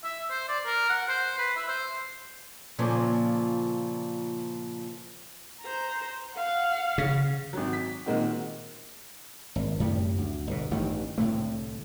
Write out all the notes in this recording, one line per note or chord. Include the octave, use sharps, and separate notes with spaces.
E5
C5
D5
A#4
F#5
C5
B4
E5
C5
A#2 C#3 F3 A#3 C4 A4
C5 A#5
F5 F#5
C#3
G#1 F#3
B6
A#2 D#3 G#3 A#3 C4 F#4
G#1
F#2 A2 C3 G3
D2
G1 B2
A1 G2 D#3
C2 A2 D3 A3